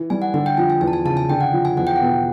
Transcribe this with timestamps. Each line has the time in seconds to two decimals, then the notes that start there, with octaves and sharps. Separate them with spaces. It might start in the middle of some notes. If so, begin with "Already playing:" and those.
Already playing: E3
0.10 G3 G#5
0.22 F#5
0.34 D3 F#5
0.46 G5
0.57 F3 G#5
0.70 G#5
0.81 E2 G#5
0.88 A5
0.93 G#5
1.05 C#3 A5
1.17 G#5
1.29 D3 G5
1.41 F#5
1.53 F3
1.65 G#5
1.77 E2 F#5
1.87 G5
1.96 B2 F#5